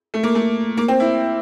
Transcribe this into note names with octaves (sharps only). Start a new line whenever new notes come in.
A3
A#3
A3
A#3
C4
E4